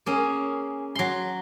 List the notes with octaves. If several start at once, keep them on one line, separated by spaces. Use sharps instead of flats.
A#3 C#4 G#4
F#3 C6